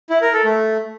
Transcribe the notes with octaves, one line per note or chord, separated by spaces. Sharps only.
E4
A#4
A4
A3